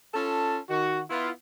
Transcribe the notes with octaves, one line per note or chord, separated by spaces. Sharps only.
C#4 F4 A4 A5
D#3 F#4
B3 E4 F4